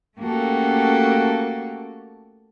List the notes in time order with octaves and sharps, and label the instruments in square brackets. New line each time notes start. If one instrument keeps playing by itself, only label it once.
[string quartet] A3 A#3 C#4 F#4 G4 A4